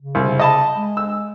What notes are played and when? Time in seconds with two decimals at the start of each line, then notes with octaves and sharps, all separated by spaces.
0.01 C#3
0.15 C2
0.39 D#5 A5 B5
0.75 G#3
0.97 E6